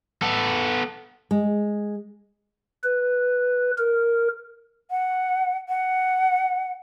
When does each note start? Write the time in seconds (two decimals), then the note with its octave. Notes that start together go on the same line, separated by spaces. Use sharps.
0.22 B3 A4
1.31 G#3
2.84 B4
3.78 A#4
4.91 F#5
5.69 F#5